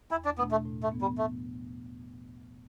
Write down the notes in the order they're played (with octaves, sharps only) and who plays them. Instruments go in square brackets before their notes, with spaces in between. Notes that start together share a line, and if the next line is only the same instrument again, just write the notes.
[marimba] E2 [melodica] E4
[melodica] D4
[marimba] B2 A3 D4 [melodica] B3
[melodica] A3
[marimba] A2
[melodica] A3
[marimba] F3 B3
[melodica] G3
[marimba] A2 [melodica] A3